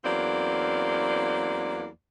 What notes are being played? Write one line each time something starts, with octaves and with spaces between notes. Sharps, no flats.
E2 F#3 A#3 C4 C#4 D5